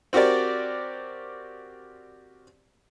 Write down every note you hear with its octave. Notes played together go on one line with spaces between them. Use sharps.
C4 F#4 G4 A#4 D5